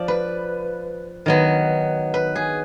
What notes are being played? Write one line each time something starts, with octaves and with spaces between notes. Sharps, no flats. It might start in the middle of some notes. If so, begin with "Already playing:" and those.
Already playing: F3 D5
B4
D#3 F#3 B3
B4
G#4